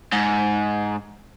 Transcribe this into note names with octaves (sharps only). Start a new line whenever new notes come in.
G#2